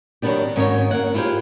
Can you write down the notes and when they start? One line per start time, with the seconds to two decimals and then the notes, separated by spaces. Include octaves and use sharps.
0.22 D#3 F#3 G#3 B3 D4 G4
0.56 G#2 D#3 C#4 F#4 B4 C#5
0.91 A#3 F#5
1.14 E4 F4 G4 G#4 C5